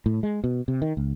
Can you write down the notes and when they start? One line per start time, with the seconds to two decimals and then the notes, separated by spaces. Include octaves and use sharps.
0.06 A2
0.23 G#3
0.44 B2
0.68 C3
0.82 D#3
0.97 C#2